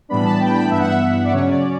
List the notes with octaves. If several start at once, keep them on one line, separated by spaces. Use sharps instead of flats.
A2 E3 G3 B3 D4 B5
A5
G5
B5
G2 E3 B3 E5
F#5
E5
D5
C#3 F#3 C#4 C#5
D5